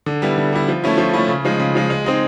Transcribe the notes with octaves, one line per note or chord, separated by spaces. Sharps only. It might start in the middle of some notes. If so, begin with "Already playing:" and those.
D3
G3 B3 E4
D3
G3 B3 E4
F3
A3 C#4 E4
F3
A3 C#4 E4
C#3
F3 G#3
C#3
F3 G#3
G#3
C4 D#4 G#4